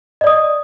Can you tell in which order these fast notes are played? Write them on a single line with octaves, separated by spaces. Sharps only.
D#5 D5 D#6